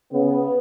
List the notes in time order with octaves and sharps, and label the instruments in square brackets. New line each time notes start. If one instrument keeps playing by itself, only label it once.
[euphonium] C#3 [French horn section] B3